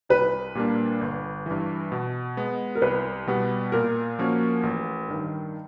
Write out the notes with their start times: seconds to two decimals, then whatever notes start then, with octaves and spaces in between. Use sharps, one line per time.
0.09 C2 B4
0.55 A#2 G3 A#3 D4
1.01 G1
1.46 G2 E3
1.92 B2
2.37 G#3 B3
2.75 A#4
2.82 C2 B4
3.27 B2 G3 B3
3.72 A#2 A#4
4.19 F3 A#3 C#4 F#4
4.63 A1
5.09 G2 D#3